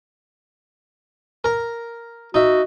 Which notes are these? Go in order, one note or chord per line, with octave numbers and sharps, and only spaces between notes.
A#4 A#5
D#4 F#4 E5